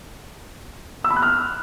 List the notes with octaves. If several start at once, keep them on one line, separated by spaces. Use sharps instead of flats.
E6
B5
F#6
F6